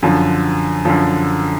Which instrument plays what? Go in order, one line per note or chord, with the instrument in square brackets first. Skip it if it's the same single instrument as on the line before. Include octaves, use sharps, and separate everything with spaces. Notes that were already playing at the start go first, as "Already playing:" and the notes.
[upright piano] F#2 D3 F3
F#2 D3 F3